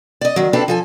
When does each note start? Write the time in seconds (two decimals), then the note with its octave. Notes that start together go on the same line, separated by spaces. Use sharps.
0.21 D5 D#5
0.36 D#3 F#3
0.53 C4 D4 E4 G4 A4 B4
0.68 F3 A4 G#5